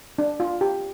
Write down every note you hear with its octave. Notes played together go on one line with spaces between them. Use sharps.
D4
F4
G4